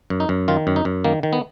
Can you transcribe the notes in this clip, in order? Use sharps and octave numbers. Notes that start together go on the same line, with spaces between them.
F#2
D#4
F#2
D#3 F4
F#2
D#4
F#2
D#3 A#3
D#3
B3